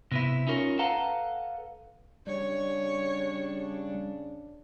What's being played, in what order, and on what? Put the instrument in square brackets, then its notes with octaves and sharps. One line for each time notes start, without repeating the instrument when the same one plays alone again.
[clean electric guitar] C3 B3 E4
C#4 D#4 F4 A#4 C5 C#5
A4 B4 F5 F#5 A5 A#5
[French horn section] C#3 D4 [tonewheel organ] G3 [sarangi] C#5